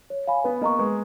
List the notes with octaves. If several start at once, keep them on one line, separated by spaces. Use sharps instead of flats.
C#5
F5 G#5 B5
B3 B4
A#3 D#5 A#5 C#6
G#3 B4